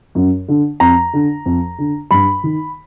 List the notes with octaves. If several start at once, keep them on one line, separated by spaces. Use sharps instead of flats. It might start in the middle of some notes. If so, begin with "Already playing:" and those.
F#2
D3
F2 A#5
D3
F2
D3
G2 B5
D#3